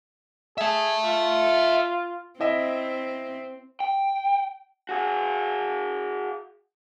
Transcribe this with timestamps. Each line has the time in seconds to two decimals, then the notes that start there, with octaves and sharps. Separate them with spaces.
0.58 G#4 E5 A5
1.04 F4
2.40 C4 E4 D#5 E5
3.80 G5
4.89 F#4 G#4